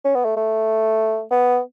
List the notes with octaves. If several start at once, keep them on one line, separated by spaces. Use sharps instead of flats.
C#4
B3
A3
A3
B3